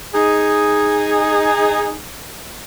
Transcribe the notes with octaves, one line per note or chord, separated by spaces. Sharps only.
D#4 G#4